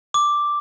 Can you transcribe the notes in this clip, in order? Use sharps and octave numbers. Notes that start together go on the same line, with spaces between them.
D6